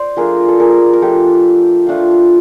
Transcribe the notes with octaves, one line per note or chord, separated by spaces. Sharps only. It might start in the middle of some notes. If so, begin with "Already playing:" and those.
Already playing: C5 D5
F3 A3 D4 F4 G#4 A#4
A4
G#4 A#4
A#4
F3 A3 D4 F4 G4 A4
F3 A3 D4 F4